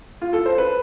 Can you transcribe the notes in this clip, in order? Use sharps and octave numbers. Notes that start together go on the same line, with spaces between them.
F4
A4
C5
B4